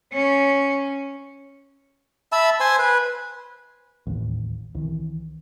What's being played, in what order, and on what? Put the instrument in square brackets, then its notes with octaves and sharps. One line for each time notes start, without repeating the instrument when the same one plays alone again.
[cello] C#4
[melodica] E5 A5 B5 E6
C5 G#5 C6
B4
[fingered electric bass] D1 A1 D#2
C2 D#3 E3